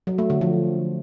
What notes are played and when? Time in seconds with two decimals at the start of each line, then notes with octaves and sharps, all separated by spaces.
0.07 F#3
0.18 A3
0.30 D3
0.41 F3